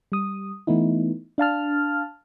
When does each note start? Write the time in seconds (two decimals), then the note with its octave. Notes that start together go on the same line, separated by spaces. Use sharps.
0.12 G3 D#6
0.67 E3 A3 B3 D#4 E4
1.38 D4 F5 A5 F6